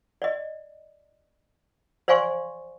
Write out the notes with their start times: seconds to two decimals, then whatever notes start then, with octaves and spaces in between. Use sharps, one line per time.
0.22 D5 D#5
2.08 C5 D5 F5 G#5 C6 C#6